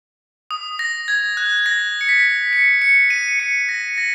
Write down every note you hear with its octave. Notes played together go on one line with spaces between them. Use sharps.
D#6
A#6
G#6
F#6
A#6
C#7
B6
C#7
C#7
D#7
C#7
A#6
A#6